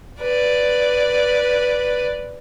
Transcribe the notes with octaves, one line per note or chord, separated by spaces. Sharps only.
B4 D5